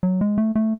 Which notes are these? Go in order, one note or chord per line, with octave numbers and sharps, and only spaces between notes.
F#3
G#3
A3
A3